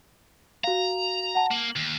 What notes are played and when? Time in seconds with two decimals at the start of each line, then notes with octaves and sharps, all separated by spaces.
0.64 F#4 F5 A#5
1.35 F#5 A5
1.51 A#3 F#7
1.76 D#2